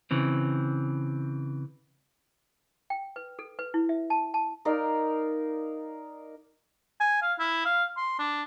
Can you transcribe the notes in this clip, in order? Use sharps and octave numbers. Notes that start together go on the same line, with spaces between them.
C#3 E3 C4
G5
B4
A4
B4
E4
E5
A5
A5
D#4 A#4 D5 F5
G#5
F5
E4
F5
C6
D4